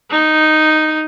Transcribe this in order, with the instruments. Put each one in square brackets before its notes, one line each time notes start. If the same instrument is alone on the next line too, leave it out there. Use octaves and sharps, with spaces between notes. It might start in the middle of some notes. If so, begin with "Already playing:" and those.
[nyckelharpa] D#4